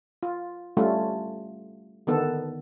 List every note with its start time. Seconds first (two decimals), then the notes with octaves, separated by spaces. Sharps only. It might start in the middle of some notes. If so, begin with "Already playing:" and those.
0.23 F4
0.77 G3 A3 C#4 F4
2.07 D3 D#3 B3 A4